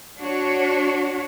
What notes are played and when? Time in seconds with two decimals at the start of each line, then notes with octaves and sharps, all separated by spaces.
0.18 D4 F#4 C#5